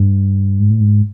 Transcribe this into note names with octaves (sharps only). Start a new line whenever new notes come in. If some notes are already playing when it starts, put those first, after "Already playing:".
Already playing: G2
G#2
A2
G#2